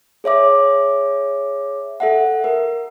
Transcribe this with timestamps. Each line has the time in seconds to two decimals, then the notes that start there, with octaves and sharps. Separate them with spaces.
0.24 G#4 C#5 E5 D6
2.00 A4 E5 F#5
2.44 A#4